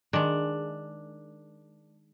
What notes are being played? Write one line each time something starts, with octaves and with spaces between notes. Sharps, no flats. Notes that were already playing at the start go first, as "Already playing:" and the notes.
D#3 G#3 D4